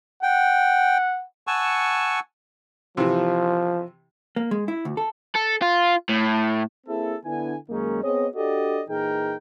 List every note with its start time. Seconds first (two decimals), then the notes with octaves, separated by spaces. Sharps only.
0.23 F#5 G5
1.47 F#5 G#5 A5 C#6 E6
2.97 C3 E3 F3
4.36 A#3
4.51 G#3
4.68 E4
4.85 D2
4.97 A4
5.35 A4
5.62 F4
6.09 A2
6.87 A#3 C4 E4 G#4 A4
7.24 D3 B3 D4 E4 G#5
7.68 F#2 D#3 G#3 A#3 C#4 D#4
8.02 B3 C4 G#4 C#5 D#5
8.35 D4 F#4 G4 A4 D5 D#5
8.88 A#2 E3 D#4 G#4 A#4 G5